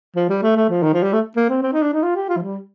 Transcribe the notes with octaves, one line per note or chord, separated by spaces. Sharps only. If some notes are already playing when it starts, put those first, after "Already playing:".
F3
G3
A3
A3
F3
D#3
F3
G3
A3
A#3
C4
C4
D#4
D4
D#4
F4
G4
F4
F3
G3